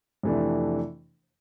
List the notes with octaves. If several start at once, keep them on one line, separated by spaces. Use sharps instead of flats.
F2 C3 E3 A3 D4